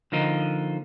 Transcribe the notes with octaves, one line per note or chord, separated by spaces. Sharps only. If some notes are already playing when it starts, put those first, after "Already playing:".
D3 F3 A#3 D#4